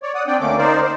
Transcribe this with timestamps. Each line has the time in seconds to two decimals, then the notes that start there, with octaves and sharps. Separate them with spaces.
0.03 C#5 D5
0.15 D5 F#5 D#6
0.27 C4 D4 D5 G5
0.40 D2 D3 A3 A#3 C#4 D6
0.58 D#4 A#4 C5 D5
0.83 C5